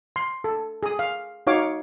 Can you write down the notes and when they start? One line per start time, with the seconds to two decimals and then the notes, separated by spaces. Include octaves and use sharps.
0.16 C6
0.44 A4
0.83 G#4 D#6
0.99 F5
1.47 D#4 F#4 C#5 F5 D6